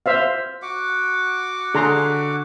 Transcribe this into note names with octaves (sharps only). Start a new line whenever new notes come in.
C5 E5 F5
F#4 F#5 D6
D3 G#4 A#5 C6